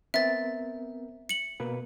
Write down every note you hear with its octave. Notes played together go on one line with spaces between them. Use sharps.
B3 C4 A#4 E5 A6
C#7 F#7
B2 A#3 B4